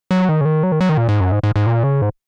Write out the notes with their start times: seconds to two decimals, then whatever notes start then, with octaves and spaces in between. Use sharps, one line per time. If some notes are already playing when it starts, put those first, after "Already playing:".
0.11 F#3
0.29 D#3
0.41 C#3
0.45 D#3
0.63 F#3
0.72 D#3
0.81 F#3
0.89 D#3
0.97 A#2
1.09 G#2
1.21 F#2
1.32 G#2
1.43 G#2
1.56 G#2
1.67 A#2
1.84 C#3
2.02 G#2